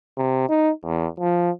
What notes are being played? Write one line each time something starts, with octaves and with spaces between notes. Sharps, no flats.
C3
D#4
E2
F3